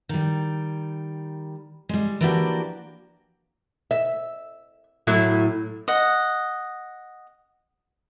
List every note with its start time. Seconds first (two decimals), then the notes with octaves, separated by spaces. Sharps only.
0.09 D#3 G3
1.89 G3 G#3
2.21 E3 F3 A#3 D4 F#4 G4
3.91 E5
5.07 A2 F#3 E4
5.88 D#5 F#5